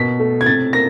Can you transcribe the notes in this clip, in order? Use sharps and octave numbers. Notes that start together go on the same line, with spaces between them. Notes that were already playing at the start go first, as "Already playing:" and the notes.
Already playing: B2 A#3 B6
A3
G#6
C3 A6
A#3 A#6